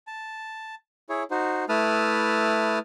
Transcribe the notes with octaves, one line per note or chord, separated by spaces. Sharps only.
A5
E4 G#4 C#5
D#4 F#4 C5
A3 E4 B4 A5 D#6 F6